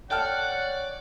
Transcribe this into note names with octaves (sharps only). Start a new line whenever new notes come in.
C#5 D5 F#5 G5 A5 F6